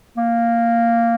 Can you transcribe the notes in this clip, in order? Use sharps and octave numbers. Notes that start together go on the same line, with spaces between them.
A#3